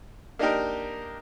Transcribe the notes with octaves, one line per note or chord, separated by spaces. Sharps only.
A#3 D4 D#4 G4 A#4